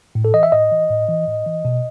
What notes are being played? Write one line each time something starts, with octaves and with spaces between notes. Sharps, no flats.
A2
A4
E3 D#5
E5
A2 D#5
E3
A2
E3
A2
E3
B2